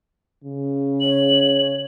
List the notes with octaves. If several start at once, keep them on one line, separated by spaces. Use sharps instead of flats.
C#3
C#5 F#7